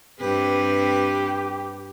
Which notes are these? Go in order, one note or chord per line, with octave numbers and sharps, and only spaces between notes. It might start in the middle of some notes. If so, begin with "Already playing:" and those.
G2 C4 G4 B4